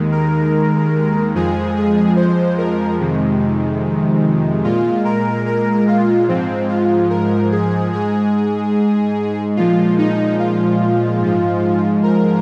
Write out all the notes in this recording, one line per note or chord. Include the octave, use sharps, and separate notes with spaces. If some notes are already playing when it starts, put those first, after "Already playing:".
Already playing: D#2 D#3 G#3
A#4
F2 F3 G#3 G#4
G#4
C5
A#4
F2 C3 D#3 G#3
A#2 G#3 F4
A#4
A#4
F4
G#2 F3 G#3 C4
F4
A#4
G#4
G#2 G#3 G#4
A#2 F3 G#3 F4
D#4
F4
G#2 F3 G#3
A#4